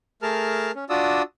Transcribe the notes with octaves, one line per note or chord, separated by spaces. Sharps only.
A3 G#4 A#4 A5 F6
C#4
D4 F4 F#4 D5 D#6 E6